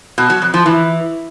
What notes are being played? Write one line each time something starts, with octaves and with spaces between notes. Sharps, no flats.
B2
F#3
F2
F3
E3